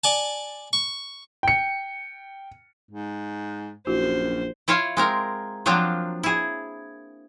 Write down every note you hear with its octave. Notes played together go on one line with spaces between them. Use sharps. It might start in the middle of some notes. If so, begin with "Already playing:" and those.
D5 G#5 A5
C#6
G5 C#7
G#2
A#1 F#2 E4 F#4 C5
E4 F4 C#5 F5
G#3 C4 A#4
F3 F#3 A#3 C4 D4 F4
E4 G#4